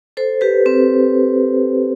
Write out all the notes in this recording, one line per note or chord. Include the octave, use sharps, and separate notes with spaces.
A4 C5
G4 B4
C4